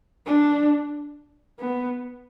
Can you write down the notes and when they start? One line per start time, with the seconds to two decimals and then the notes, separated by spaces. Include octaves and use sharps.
0.26 D4
1.60 B3